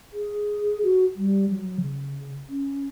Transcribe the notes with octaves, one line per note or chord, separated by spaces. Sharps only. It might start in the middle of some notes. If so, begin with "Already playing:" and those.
G#4
F#4
G3
F#3
C#3
C#4